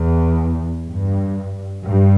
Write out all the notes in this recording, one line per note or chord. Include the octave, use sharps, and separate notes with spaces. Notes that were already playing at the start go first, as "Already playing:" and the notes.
Already playing: E2
G2
G2